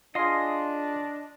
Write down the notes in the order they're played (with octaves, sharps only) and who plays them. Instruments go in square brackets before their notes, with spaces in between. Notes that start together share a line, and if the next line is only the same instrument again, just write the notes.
[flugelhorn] D4 [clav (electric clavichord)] F4 G#4 [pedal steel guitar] D#5 C6